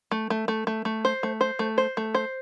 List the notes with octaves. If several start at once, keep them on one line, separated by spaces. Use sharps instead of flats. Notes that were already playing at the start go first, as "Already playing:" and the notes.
A3
A3
A3
A3
A3
C5
A3
C5
A3
C5
A3
C5